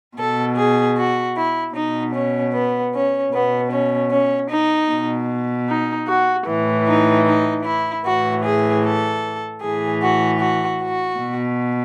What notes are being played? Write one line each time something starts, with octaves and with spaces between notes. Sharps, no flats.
B2 A4
G#4
F#4
E4
B2 D#4
C#4
B3
C#4
B2 B3
C#4
C#4
D#4
B2
D#4
F#4
A2 E3
D#4
D#4
E4
A2 E3 F#4
G#4
A4
A2 E3 G#4
F#4
F#4
F#4
B2